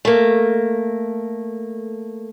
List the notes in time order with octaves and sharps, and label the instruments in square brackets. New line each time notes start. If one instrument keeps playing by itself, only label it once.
[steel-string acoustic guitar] A3 A#3